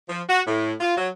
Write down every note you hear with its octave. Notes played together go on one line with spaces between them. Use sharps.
F3
F#4
A2
F4
F#3